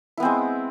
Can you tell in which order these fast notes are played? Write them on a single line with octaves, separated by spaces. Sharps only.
E4 B3 C4 G#3